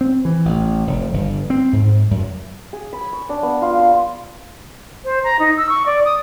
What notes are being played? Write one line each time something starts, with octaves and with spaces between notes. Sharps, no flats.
C4
E3
A1
F1
G1
C4
G#2
F#2
G#4
B5
C#6
D4
B3
F4
C6
C5
A#5
D#4
E6
C#6
D5
D#6